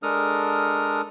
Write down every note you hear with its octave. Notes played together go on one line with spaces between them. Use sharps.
G#3 D4 A4 A#4 D#6 F6